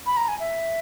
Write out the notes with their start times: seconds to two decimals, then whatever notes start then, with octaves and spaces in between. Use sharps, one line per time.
0.06 B5
0.17 A#5
0.28 G#5
0.40 E5